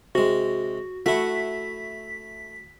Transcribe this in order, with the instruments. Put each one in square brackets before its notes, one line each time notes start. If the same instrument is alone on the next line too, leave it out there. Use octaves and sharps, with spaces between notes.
[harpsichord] C3 G#3 [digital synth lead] F#4
[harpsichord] A3 E4 [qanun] F#4 [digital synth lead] B6